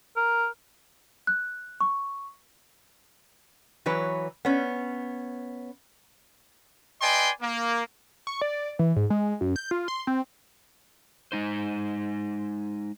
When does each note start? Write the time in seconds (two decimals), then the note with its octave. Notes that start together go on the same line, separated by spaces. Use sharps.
0.17 A#4
1.27 F#6
1.81 C#6
3.86 E3 F#3 B4 C#5
4.45 B3 C#4
7.01 B4 D5 D#5 G5 G#5 C6
7.41 A#3
8.27 C#6
8.41 D5
8.79 E3
8.96 G#2
9.10 G#3
9.41 F#2
9.56 G6
9.71 F4
9.88 C6
10.07 C4
11.32 G#3 D#4 C5